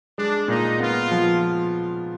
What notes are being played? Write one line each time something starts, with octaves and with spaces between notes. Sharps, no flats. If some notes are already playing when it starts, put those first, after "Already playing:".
G#3 D4
A#2 D#4
B3 F4
F3